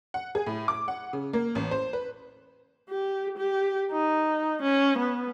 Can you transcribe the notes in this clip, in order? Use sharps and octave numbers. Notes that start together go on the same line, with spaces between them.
F#5
G#4
A2
D6
F#5
C#3
A#3
A1
C5
B4
G4
G4
D#4
C#4
B3